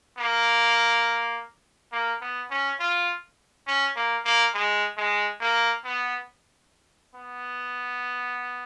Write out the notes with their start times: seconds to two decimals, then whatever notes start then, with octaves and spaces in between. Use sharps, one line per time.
0.18 A#3
1.92 A#3
2.21 B3
2.50 C#4
2.80 F4
3.67 C#4
3.96 A#3
4.25 A#3
4.54 G#3
4.98 G#3
5.41 A#3
5.85 B3
7.15 B3